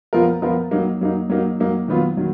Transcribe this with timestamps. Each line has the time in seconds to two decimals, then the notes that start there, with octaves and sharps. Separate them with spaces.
0.13 F3 B3 F4 A#4
0.42 F3 B3 F4 A#4
0.71 F#3 A#3 D#4
1.01 F#3 A#3 D#4
1.30 F#3 A#3 D#4
1.60 F#3 A#3 D#4
1.88 D#3 F#3 B3 F4
2.17 D#3 F#3